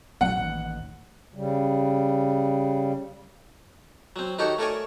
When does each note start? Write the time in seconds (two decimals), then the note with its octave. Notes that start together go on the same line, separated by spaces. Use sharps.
0.21 A#1 F#3 A3 F#5
0.36 A1 D#2
1.34 C#3 G3
4.16 F#3 C4
4.38 D#3 D#4 F#4 G4 A4 C#5
4.58 A3 A4 A#4 C#5 D5 G#5